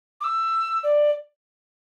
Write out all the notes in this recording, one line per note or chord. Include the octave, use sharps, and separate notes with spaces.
D6
E6
D5